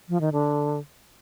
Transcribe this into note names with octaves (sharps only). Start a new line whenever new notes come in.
F3
D#3
D3